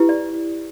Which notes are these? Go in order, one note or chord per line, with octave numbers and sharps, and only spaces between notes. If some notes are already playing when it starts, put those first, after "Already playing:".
Already playing: E4 G4 B4
D5